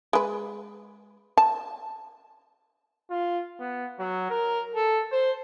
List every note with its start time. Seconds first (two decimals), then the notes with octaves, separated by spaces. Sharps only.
0.13 G#3 B4
1.37 A5
3.10 F4
3.60 B3
3.99 F#3
4.30 A#4
4.76 A4
5.12 C5